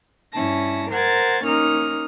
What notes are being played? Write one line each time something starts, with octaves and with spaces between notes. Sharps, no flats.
G2 C#4 E4 A5 A#6
A#4 C5 F#5 G#6 A6
A#3 C#4 D#4 D#6 F6